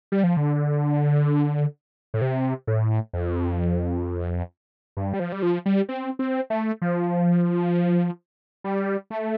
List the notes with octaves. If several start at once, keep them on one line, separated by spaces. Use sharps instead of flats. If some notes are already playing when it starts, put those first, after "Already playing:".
G3
F3
D3
A2
C3
A2
F2
G2
G3
F3
G3
F3
G3
C4
C4
A3
F3
G3
A3